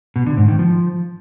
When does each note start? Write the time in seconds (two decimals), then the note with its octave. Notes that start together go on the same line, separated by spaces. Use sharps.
0.16 B2
0.26 D3
0.37 G#2
0.48 D#3
0.59 F3